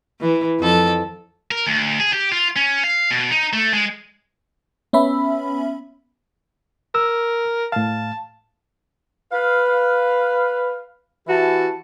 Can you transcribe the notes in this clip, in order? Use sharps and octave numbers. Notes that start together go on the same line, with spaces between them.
E3
F2 A4
A#4
D2
G#4
G4
F4
C#4
F5
B2
D#4
A3
G#3
B3 C#4 E5 B5
A#4 E6
A2 F5 A5
B4 F5
E3 E4 F#4 G4 A5